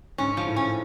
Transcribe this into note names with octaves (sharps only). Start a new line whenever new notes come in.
G#2 C#4
F3
A2
C#4